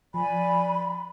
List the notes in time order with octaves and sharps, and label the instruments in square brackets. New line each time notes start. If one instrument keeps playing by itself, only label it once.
[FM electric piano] F3 [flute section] D5 G#5 [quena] B5